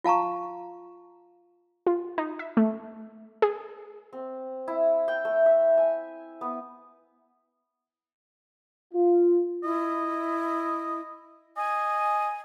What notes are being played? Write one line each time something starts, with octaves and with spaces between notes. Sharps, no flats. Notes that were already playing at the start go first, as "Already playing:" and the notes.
F4 F5 A5 A#5 C#6
F4
D#4
E5
A3
G#4
C4
E4
G5
A3
E5
G#5
B3
F4
E4 D#5
D#5 G#5